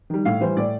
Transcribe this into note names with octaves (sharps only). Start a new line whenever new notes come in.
D#3 G3
A2 F5
E3 G3 C5
A2 D5